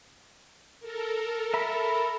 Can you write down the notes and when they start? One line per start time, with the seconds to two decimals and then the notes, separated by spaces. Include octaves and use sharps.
0.79 A4 A#4
1.54 E5 A#5 B5